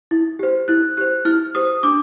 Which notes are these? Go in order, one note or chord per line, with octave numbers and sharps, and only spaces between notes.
E4
G4 C5
E4 F#6
G4 C5 F#6
E4 F6
G4 C5 D#6
D4 D6